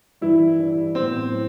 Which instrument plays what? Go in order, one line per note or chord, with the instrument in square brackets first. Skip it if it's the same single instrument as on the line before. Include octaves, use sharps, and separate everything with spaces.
[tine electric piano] G2 E3 G3 [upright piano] E4
[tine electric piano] G2 E3 G3
[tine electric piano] A2 F#3 B3 [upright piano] C4
[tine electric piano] A2